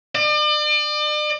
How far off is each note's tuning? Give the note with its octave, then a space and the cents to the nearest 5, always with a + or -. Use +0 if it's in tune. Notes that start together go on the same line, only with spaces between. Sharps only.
D5 +40